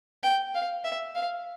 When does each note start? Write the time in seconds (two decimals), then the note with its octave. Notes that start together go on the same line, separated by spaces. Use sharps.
0.23 G5
0.54 F5
0.85 E5
1.15 F5